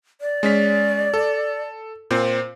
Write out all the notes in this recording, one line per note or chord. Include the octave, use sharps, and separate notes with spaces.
D5
G#3 C#4 B6
A4
A#2 C4 C5